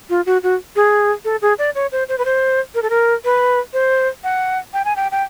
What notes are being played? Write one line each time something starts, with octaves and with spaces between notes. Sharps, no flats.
F4
F#4
F#4
G#4
A4
G#4
D5
C#5
C5
C5
B4
C5
A#4
A4
A#4
B4
C5
F#5
G5
G#5
G5
G5